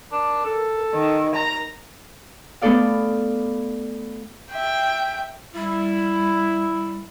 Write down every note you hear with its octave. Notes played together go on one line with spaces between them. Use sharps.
D4 A#4
A4
D#3 A#4
A#5
A3 B3 D4 A4 D5 F5
E5 G5
G3 E4